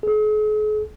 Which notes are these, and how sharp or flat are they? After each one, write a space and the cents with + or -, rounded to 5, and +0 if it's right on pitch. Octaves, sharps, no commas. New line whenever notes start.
G#4 +45